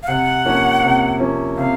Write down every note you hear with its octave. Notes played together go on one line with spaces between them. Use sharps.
F5
C3 F#5
F3 A#3 C#4
C3
F3 A#3 C#4
C3 F5